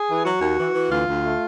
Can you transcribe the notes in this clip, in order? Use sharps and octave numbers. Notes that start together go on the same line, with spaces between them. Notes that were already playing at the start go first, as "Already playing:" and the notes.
Already playing: G#4
E3
F#3 F#4
D#2
E3
E3
D2 F4
D2
A3